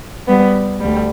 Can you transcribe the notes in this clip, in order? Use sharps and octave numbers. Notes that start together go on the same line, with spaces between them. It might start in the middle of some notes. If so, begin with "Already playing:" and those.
G3 B3
D2 G3